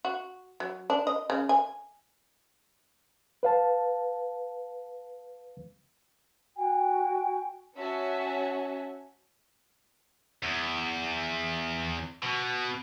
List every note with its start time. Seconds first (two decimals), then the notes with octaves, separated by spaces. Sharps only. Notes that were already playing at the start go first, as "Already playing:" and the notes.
0.05 F#4
0.60 F#3
0.90 D4
1.07 D#5
1.30 C#3
1.49 G#5
3.43 B4 F5 A5
6.55 F#4 G5 G#5
7.77 C#4 F#4 E5 F#5 G#5 A5
10.43 E2
12.23 B2